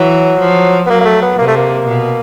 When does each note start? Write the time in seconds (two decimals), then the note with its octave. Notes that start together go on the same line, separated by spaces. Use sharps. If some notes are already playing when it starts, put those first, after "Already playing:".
Already playing: E3 F#3
0.40 F3
0.86 B3
0.89 F#3 A#3
1.01 A#3
1.05 A3
1.22 B3
1.38 C3 A#3
1.48 A3
1.57 A#3
1.87 B2